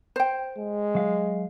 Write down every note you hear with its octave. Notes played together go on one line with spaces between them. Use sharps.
C5 G5
G#3
F#3 F5